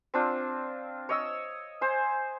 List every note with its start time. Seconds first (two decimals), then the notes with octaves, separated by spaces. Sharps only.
0.14 C4 D4 F4
1.09 C#5 D#5 E6
1.81 C5 G#5